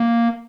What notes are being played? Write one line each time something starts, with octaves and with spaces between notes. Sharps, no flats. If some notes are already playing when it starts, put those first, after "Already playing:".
Already playing: A#3